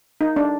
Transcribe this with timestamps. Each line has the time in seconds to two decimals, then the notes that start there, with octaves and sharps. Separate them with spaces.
0.21 D#4
0.36 D4